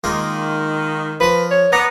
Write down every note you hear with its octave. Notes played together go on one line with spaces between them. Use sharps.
D#3 G#3 A#3 F4
F3 A#4 B4
C#5
B3 D5 A#5